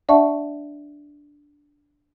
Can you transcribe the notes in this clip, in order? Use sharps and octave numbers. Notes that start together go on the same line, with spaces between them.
D4 D5 E5 F#5 A5 C#6